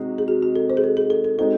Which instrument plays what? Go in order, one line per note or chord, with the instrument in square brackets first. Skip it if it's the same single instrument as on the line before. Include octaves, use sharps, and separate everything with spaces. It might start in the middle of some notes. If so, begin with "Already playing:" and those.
Already playing: [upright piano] C3 G#3 D#4 F#4
[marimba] G#4
F#4
F#4
A4
C5
G#4
A4
G#4
A4
A4
[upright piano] G#3 C4 D#4 F#4 [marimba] A4